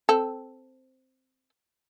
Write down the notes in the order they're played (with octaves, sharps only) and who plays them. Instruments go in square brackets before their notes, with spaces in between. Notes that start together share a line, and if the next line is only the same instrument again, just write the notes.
[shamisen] C4 A4